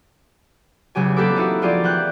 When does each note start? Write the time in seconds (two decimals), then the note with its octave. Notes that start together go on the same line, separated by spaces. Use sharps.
0.95 E2 C#3 F#3 G4 G#5
1.16 A#3 C4 G4 A4 B4 D6
1.36 D#4 E4 F#4
1.61 F3 D#4 F4 G4 G#4 D5
1.84 E3 G5 F#6 G6